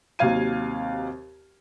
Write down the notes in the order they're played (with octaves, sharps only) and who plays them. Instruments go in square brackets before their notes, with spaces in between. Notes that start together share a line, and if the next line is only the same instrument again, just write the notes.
[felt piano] D#2 C3 F#3 F5 G#6 D#7